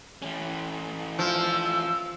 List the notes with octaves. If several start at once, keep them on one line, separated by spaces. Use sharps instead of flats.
E3 C#4
F3 E6